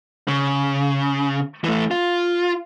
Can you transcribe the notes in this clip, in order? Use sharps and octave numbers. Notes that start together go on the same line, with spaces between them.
C#3
E3 A3
F4